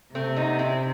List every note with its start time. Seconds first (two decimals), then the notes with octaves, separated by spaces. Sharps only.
0.15 C3 A3 C4
0.36 B3 D#4
0.59 C4 E4